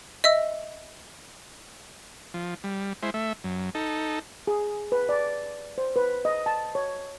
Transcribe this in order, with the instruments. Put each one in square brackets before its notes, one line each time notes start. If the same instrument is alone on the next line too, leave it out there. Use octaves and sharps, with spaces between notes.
[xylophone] D#5 E5 E6
[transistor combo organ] F3
G3
G#3 E4 C5
A3 E5
F#2
D#4 A4
[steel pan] G#4
B4
D5
C5
B4
D#5
A5
C#5